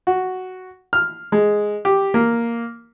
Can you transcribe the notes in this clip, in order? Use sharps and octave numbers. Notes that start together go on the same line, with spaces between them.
F#4
F6
G#3
G4
A#3